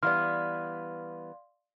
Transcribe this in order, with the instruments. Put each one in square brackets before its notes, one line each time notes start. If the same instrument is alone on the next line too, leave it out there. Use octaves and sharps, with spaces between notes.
[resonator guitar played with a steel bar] E3 G3 B3 [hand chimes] D5 F5 C6 [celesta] F6